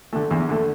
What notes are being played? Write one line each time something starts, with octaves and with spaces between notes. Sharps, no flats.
D3 A3
E2
D3 A3